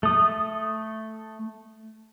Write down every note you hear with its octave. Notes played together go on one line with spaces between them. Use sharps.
A3 D#6